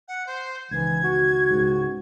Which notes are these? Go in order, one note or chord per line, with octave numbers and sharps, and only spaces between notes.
F#5
C5
C#2 D#3 E3 G#6
F#4
C#2 G#2